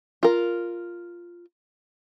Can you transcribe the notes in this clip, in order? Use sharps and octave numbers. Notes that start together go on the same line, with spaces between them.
F4 A#4